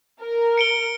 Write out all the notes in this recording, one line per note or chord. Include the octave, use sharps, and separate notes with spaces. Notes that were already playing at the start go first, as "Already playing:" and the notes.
A#4
C#7 D7 G7